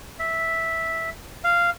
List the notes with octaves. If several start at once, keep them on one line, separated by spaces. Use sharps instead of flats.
E5
F5